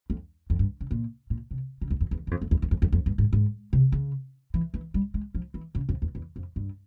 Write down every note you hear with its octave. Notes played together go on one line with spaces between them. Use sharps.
F2
F2
G2
C#3
A#2
A#2
C3
C#3
E2
F2
E2
G2
F2
F2
E2
E2
F2
F2
F2
G2
G#2
G#2
C3
C#3
E3
E3
G3
G#3
F3
E3
C#3
F2
E2
E2
F2
G2